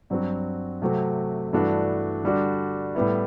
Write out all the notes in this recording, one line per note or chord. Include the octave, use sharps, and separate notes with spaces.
G2 F#3 C4 F#4
C3 F#3 A3 C4 F#4
G2 E3 A3 D4 F#4
D3 G3 D4 F#4
A2 G3 B3 E4